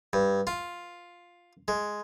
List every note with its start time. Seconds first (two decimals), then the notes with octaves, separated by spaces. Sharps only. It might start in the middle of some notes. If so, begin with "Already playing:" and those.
0.13 G2
0.47 F4
1.68 G#3